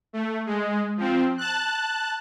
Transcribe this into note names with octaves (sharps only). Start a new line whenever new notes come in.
A3
G#3
F3 C4
A5 F#6